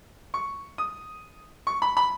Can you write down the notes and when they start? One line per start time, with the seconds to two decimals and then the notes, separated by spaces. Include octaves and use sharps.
0.34 C#6
0.78 D#6
1.67 C#6
1.82 B5
1.97 B5